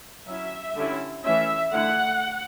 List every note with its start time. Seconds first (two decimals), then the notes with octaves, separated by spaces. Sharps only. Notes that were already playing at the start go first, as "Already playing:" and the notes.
0.27 F#3 C#4 E4 E5
0.76 D3 G3 C#4 E4
1.24 E3 A3 C#4 E5
1.73 D3 A3 E4 F#5